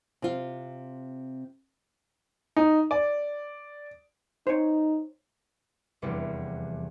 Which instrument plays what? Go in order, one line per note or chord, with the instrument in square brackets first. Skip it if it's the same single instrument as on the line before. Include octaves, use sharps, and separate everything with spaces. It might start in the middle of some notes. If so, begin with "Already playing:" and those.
[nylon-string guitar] C3 F4
[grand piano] D#4
D5
[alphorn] D#4 [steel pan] C5 C#5
[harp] F1 E2 G3 G4 E5